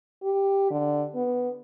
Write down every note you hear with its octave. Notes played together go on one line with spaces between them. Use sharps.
G4
D3
B3